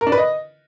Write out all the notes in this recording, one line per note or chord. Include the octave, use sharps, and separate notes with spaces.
A#4
D4
B4
D#5